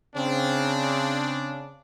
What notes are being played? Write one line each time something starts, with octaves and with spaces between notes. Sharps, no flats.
C#3 C4 D4